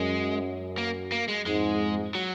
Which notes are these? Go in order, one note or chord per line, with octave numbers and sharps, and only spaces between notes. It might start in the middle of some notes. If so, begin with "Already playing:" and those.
Already playing: F#2 G#3
A#3
A#3
G#3
F2 G#2 G#3
F#3